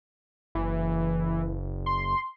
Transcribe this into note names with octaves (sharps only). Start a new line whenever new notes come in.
F#1 E3
C6